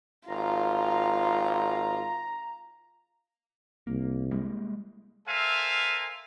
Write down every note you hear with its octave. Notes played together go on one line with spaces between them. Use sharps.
G#1 F4 A#5
C2 A#3
G3 G#3 A#3
A4 A#4 C5 E5 F5 G#5